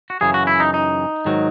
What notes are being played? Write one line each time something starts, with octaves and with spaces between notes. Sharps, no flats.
F#4
F#2 C#3 E3 G#4
F#4
E4
D#4
D#4
G#2 D#3 F#3